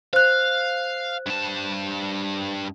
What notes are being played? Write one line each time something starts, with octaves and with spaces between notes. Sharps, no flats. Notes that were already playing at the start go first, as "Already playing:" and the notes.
C5 F5 F#6
G2 A5